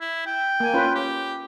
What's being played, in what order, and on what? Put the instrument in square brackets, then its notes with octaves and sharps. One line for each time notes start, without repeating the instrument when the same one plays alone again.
[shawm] E4
G5
[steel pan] A#3 G#5
C#4 F4 B4
[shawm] G4